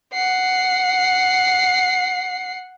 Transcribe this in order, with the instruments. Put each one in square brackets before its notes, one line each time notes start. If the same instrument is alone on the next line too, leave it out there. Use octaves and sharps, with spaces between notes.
[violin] F#5 C7